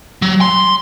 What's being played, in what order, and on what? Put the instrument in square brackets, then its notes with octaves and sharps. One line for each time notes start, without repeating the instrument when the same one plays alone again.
[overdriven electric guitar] F#3
C6